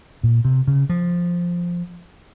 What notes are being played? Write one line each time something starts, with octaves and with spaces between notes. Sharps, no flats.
A#2
C3
C#3
F3